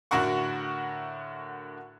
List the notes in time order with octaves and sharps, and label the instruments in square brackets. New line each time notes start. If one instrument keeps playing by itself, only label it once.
[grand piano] A2 D3 F#4 A#4 F#5 C#6